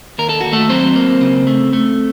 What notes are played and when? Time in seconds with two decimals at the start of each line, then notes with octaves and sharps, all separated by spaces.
0.18 D#2 A#4
0.29 A4
0.41 D#2 F#4
0.53 A3 A4
0.69 F#3 C4 C5
0.96 A#3
1.21 C#3
1.47 A3
1.73 A3